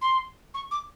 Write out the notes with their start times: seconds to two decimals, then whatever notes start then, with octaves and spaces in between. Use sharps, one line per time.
0.01 C6
0.54 C#6
0.71 D6